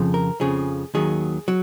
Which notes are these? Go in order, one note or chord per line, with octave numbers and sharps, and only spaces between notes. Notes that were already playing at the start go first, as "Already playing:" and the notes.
Already playing: F2 C#3 F3
A#4
F2 C#3 F3 G#4
D#2 D#3 F#3 G#4
F#3